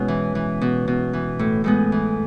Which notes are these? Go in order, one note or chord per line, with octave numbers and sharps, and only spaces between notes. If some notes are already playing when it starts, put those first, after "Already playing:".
Already playing: B2 G#3 C#4 E4
E3
E3
B2
B2
E3
A2
A2 G#3 B3
E3